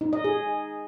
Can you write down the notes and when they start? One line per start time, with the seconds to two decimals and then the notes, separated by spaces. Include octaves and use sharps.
0.01 D#4
0.13 D#5
0.24 G#4